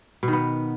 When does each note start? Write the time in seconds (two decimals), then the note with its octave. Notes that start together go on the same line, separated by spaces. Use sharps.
0.23 B2
0.28 D#3
0.33 B3